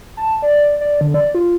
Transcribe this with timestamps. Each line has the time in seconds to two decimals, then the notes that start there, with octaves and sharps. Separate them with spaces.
0.17 A5
0.42 D5
0.81 D5
1.01 D3
1.14 D5
1.35 F4